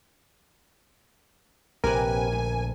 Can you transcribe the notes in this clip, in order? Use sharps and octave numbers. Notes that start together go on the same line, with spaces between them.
A#1 C3 G4 A#4 B4 G#5
D2